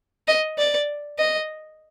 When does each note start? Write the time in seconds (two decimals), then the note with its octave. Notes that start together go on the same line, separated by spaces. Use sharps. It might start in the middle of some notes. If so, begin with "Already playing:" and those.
0.28 D#5
0.58 D5
1.19 D#5